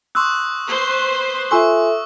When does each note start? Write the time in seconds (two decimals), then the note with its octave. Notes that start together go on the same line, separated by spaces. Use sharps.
0.15 C6 C#6 D#6 E6 F#6
0.71 B4 C5
1.51 F4 A4 E5 G#5 C6 C#6 E6